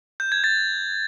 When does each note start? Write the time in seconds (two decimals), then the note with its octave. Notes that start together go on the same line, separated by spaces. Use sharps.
0.20 G6
0.32 G#6
0.44 A6